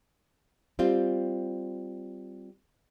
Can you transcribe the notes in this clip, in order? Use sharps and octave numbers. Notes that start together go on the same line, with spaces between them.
G3 C4 F4